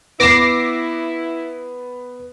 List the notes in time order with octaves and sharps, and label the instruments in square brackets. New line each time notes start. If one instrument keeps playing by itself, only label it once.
[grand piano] B3 E7 [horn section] E4 [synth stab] D6 A#6 C7